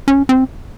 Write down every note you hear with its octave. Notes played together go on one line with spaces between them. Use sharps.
C#4
C4